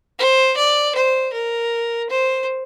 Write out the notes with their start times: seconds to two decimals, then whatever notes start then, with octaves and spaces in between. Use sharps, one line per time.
0.19 C5
0.57 D5
0.96 C5
1.33 A#4
2.10 C5